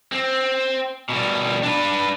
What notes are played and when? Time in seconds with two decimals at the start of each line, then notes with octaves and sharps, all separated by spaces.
0.12 C4
1.09 B2 G3
1.64 D4 B4